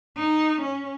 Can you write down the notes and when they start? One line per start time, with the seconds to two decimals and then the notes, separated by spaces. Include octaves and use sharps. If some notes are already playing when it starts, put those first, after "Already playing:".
0.17 D#4
0.61 C#4